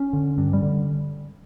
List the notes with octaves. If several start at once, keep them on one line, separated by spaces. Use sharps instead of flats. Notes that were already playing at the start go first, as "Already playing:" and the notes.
Already playing: C#4
D3
G2
G3
D3